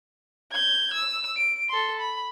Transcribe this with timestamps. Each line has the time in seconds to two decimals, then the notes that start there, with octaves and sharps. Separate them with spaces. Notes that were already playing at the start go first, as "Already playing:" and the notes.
0.52 G6 G#6
0.94 E6
1.37 D7
1.69 A4 C6
2.00 B5